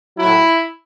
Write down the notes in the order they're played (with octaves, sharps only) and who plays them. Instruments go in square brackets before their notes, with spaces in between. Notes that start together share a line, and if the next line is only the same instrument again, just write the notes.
[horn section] A2 F#3 E4